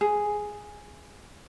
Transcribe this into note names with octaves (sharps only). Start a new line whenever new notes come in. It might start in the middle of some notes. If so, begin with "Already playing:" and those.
G#4